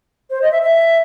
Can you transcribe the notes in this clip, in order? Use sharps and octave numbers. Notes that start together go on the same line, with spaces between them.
C5
D#5
E5
E5